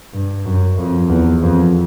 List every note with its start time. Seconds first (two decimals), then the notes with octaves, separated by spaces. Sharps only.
0.13 G2
0.45 F#2
0.78 F2
1.10 E2
1.43 F2